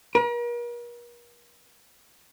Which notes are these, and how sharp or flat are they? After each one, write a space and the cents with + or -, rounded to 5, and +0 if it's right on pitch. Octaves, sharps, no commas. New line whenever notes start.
A#4 +45